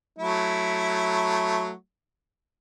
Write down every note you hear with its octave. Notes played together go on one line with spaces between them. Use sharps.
F#3 A3 E4